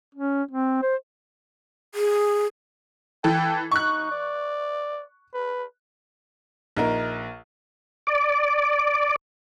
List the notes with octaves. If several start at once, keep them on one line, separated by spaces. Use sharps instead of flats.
C#4
C4
C5
G#4
E3 A4 G5
D#4 C#6 F#6
D5
B4
A#1 D#4 A#4
D5